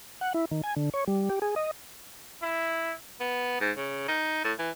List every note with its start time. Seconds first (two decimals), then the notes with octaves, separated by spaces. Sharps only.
0.21 F#5
0.34 E4
0.51 D#3
0.64 G#5
0.76 D3
0.94 C#5
1.07 G3
1.30 G4
1.42 G#4
1.56 D#5
2.42 E4
3.20 B3
3.60 G#2
3.77 C#3
4.08 D#4
4.44 A2
4.59 E3